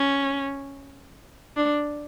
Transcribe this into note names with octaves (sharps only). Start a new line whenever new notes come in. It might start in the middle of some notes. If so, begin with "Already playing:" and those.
Already playing: C#4
D4